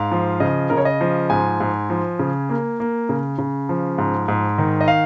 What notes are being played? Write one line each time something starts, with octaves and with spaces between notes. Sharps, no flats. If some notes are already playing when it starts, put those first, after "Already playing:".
Already playing: G#2 F5
F3
C#3 D#5
C#3 A#4
C#5
D#5
F3
G#2 G#5
G#2
F3
C#3
A#3
A#3
C#3
C#3
F3
G#2
G#2
D#3
D#5
F5